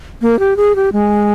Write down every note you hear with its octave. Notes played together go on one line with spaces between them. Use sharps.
A#3
G4
G#4
G4
G#3